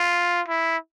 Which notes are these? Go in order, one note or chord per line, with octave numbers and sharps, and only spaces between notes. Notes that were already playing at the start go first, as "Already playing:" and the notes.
Already playing: F4
E4